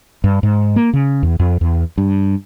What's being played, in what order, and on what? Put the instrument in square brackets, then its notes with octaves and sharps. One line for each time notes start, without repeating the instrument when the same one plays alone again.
[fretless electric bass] G2
G#2
A#3
C#3
E2
F2
E2
G2